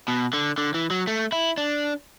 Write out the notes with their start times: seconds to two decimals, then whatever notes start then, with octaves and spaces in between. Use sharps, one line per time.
0.08 B2
0.33 D3
0.58 D3
0.74 E3
0.90 F#3
1.07 A3
1.32 E4
1.58 D4